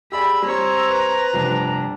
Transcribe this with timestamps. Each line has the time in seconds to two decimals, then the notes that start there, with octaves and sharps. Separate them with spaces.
0.12 G4 G#4 D5 B5 E6
0.42 G3 C4 C#5 A#5
0.89 B4
1.33 F1 G2 D4